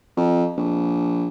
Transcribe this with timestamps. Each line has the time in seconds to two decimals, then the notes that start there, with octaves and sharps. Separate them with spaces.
0.17 F2
0.57 A#1